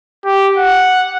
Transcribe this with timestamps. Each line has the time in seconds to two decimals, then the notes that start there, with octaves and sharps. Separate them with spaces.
0.25 G4
0.58 F#5